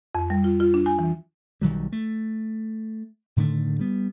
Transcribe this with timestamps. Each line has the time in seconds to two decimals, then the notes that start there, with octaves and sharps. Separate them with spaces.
0.15 F2
0.30 G3
0.44 F4
0.60 F4
0.74 D4
0.86 G#5
0.99 E3
1.61 B1 D#3 F#3 G3
1.92 A3
3.37 A2 D3 D#3 A3
3.79 G3 B3